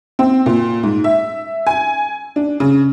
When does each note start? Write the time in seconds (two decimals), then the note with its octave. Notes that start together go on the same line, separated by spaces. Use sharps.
0.19 C4
0.46 A#2
0.83 G#2
1.04 E5
1.67 G#5
2.36 D4
2.60 C#3